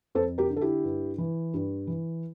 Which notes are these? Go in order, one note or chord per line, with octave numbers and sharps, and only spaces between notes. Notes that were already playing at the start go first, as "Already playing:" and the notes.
F2 A4 C5
G4 A#4
D3
A4
E4 G4
G2
E3
G2
E3